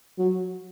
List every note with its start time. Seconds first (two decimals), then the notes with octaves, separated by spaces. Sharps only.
0.18 F#3